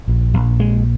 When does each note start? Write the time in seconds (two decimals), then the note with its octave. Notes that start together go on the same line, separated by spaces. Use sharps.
0.08 A#1
0.34 A#1
0.60 G#3